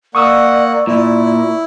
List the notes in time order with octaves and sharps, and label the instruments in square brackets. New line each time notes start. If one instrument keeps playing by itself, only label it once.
[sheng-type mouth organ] A#3 F#5 [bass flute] D5 [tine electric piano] C#6 D#6 E6
[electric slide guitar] A#2 [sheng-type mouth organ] E4